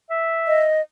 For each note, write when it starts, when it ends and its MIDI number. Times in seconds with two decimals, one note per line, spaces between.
0.10 0.67 76
0.47 0.81 75